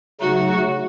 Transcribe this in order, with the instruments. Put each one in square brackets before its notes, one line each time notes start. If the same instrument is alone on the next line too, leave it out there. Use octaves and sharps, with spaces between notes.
[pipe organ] C#3 F#3 A3 D#4 [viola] F#4